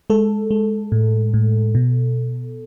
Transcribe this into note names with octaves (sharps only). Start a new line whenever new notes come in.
G#3 A4
G#3
A2
A2
B2